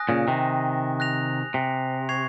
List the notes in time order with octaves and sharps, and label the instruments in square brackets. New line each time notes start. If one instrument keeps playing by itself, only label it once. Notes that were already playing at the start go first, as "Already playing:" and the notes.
Already playing: [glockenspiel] G#5 D#6 F#6 A#6
[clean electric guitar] A#2 C#3
C3 D#3
[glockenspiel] F#6 A#6 F7
[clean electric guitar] C3
[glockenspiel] C#6 G#6 C7 F7